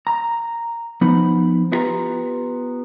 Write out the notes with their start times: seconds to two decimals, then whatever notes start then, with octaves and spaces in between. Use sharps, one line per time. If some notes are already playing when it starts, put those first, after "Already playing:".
0.07 A#5
1.01 F3 B3 D#4 F#5 B5
1.72 B3 E4 F4 G4 B4 A#5